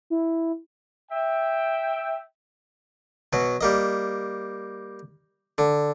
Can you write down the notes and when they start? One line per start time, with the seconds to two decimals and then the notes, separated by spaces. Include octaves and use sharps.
0.10 E4
1.12 E5 G5
3.33 B2 F#3
3.61 G3 A#3 D#5
5.58 D3